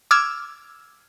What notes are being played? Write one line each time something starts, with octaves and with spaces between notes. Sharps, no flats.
D6 E6 F6 G#6